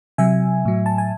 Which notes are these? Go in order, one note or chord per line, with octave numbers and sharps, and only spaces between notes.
C3 F#3 E5 G#5
A2 F#3
A5
G#5